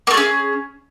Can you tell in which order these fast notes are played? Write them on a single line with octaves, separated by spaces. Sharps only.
A#3 A3 G#4 C#4